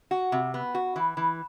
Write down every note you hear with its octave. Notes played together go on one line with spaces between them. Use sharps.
F#4
C3
B3
F#4
E3
E3